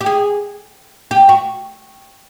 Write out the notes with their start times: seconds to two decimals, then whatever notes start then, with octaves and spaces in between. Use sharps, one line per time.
0.01 G4
0.06 G#4
1.11 G4
1.29 F#4